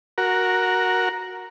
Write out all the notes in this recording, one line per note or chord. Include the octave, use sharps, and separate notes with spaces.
F#4 A#4